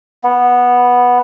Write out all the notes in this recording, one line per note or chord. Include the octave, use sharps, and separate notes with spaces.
B3